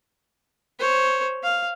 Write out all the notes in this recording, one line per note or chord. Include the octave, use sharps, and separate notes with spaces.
C5 C#5
F5